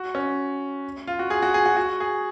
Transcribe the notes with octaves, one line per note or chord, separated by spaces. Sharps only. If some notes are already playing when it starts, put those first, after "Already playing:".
Already playing: F#4
C#4
F4
F#4
G#4
F#4
G#4
F#4
F#4
G#4